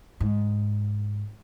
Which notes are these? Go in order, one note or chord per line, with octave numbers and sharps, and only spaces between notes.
G#2